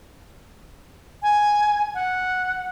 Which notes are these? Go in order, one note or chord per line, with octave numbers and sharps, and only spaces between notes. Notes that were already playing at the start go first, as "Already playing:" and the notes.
G#5
F#5